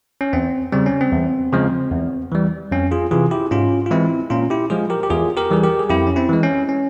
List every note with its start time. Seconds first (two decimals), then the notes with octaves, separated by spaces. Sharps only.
0.21 C#4
0.33 E2 C4
0.72 C#3 G3 C4
0.86 C#4
1.01 C4
1.12 E2
1.52 C#3 F3 G#3
1.91 E2
2.32 E3 G3
2.71 F2 C#4
2.91 F4 G#4
3.11 C3 E3 F4 G#4
3.31 E4 G4
3.51 G#2 C#4 F4
3.86 F4
3.91 E3 G#3 C4 E4
4.30 A#2 C#4 F4
4.50 E4 G4
4.70 F3 G#3 F4 G#4
4.90 G4 A#4
5.03 G4
5.10 E2 F4 G#4
5.37 G4 A#4
5.51 E3 G3 G#4
5.63 G4 A#4
5.79 G#4
5.90 F2 E4 G4
6.07 C#4
6.16 C4 E4
6.29 E3 G#3
6.43 C#4
6.69 C#4